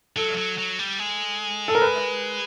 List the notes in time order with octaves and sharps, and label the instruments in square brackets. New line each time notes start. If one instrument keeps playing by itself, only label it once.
[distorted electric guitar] F#3 [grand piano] A4
[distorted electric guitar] F#3
F#3
G3
G#3
[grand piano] A4
A#4
B4